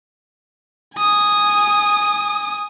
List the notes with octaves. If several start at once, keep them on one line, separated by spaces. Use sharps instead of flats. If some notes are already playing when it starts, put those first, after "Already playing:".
G#5 D#6